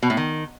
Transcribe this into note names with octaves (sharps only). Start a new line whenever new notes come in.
B2
A2
D#3